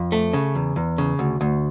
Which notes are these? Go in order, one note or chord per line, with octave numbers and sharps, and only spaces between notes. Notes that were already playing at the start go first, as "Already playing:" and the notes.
Already playing: F2
A3
C#3
E2
E2
C#3
D2
D2